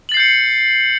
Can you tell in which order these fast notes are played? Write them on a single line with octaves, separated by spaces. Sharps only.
F#7 A6 C7 G6 C#7